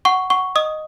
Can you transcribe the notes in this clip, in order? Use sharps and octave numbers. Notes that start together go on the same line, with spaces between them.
F#5 C#6
F#5 C#6
D#5 D#6